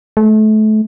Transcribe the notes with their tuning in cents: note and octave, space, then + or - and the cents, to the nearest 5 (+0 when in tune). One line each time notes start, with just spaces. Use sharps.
A3 -30